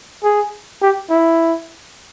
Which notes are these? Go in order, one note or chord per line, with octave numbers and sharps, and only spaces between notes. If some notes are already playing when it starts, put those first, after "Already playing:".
G#4
G4
E4